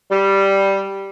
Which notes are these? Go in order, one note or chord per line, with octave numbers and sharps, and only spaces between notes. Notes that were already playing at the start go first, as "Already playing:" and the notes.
G3